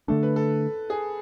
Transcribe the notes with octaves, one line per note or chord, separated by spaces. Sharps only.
D3 A3 D4 A4
B4
A4
G#4